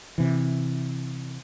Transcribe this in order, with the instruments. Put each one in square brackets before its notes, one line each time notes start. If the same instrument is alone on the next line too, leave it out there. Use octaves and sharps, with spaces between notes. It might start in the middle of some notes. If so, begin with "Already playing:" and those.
[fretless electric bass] C3 E3